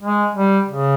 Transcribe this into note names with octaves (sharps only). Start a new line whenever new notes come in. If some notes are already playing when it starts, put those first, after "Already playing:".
G#3
G3
C#3